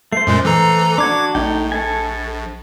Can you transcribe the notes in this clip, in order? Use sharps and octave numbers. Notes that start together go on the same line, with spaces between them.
A3 C5 C7
F#2 A#2 G#3
E3 A4 A#5
D4 F#4 D6 G#6
A#1 A3 D#4 G5
A4 G#5